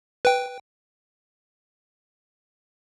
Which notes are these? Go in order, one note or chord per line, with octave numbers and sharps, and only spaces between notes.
B4 G5